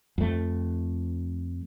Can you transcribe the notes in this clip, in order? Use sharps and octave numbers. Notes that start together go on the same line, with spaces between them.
F2 A3